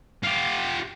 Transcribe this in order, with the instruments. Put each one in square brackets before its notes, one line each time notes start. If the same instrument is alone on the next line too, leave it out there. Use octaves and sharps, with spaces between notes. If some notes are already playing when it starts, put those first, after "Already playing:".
[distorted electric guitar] F4 G4